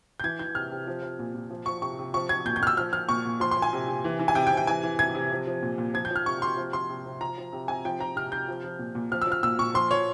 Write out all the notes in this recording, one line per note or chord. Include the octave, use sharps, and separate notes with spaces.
G6
E3 G#6
E3 G6
C3 F6
C3
F3
F3
A#2
A#2
F3
F3 C#6
C3 C#6
C3
F3 C#6
F3 G#6
A#2 G6
G6
A#2 F6
E6
F3 F6
F3 F6
A#2 C#6
A#2
F3 C6
C6
F3
G#5
C3
C3
E3
E3
G#5
C3 G5
G5
C3
G5
E3 G#5
E3
C3 G#6
C3
F3
F3
A#2
A#2
F3 G#6
G6
F3 F6
C3 C#6
C3 C6
F3
F3 C6
C3
C3
F3 A#5
F3
C3
C3 G#5
F3 G5
F3 A#5
C3 F6
C3 G6
F3
F3
A#2
A#2
F3 F6
E6
F3 F6
A#2 E6
A#2 C#6
F3 C6
F3 C#5